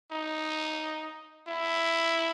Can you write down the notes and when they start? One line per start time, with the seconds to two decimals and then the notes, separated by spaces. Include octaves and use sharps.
0.12 D#4
1.48 E4